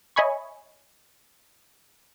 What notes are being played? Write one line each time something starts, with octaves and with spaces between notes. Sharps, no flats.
C#5 D#5 E5 G#5 B5 C#6